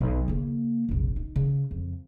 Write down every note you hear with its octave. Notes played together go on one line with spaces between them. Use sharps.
B1
C#3 A#3
F1 A#1
D#4
C#3
F2